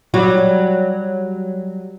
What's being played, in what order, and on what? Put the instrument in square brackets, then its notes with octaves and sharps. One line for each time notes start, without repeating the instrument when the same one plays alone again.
[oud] F#3 G3 F#4